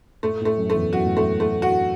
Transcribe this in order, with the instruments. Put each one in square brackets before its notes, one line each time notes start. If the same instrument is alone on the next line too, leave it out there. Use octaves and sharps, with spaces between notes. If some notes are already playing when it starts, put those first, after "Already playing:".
[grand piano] A2 [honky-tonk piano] A3
[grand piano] A2
[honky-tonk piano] A3
[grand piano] F#2
[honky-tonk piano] A3
[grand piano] E2
[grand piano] F#2 [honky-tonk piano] F#4
[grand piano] A2
[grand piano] F#2 [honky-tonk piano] A3
[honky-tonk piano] A3
F#4